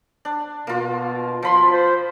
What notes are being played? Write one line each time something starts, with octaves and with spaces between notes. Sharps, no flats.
D4
B2 A#3 F4
F3 B5 C6
C5